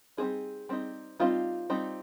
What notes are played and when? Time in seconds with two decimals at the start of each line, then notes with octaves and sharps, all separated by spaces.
0.17 G3 C4 D#4 G#4
0.69 G3 C4 D#4
1.20 G3 C4 D#4 F4
1.70 G3 C4 D#4